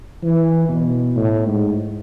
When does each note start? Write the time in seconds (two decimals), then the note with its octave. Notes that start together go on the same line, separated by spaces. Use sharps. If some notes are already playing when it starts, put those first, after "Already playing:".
0.23 E3
0.69 B2
1.16 A2
1.47 G#2